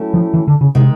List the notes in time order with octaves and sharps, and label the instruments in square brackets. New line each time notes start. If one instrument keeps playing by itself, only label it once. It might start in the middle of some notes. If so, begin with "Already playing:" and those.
Already playing: [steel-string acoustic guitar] A2 F#3 A3 C#4 E4
[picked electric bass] F3
E3
D3
C#3
[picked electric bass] C3 [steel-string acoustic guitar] D#3 G#3